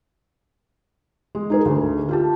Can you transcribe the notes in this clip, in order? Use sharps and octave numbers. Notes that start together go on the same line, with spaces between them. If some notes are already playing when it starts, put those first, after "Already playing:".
G#3
D#4 G#4 A#4
D2
F4 G4 A5